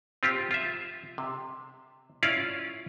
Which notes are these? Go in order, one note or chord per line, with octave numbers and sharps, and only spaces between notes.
C4 F4 G4
F4 E5
C3
C#4 E4 F4 D5 F5